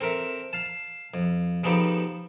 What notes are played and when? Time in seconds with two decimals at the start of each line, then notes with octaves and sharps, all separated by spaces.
0.01 C4 A4 A#4 E5
0.53 F5 A5
1.14 F2
1.64 C#3 F3 B3 D#4 G4 A4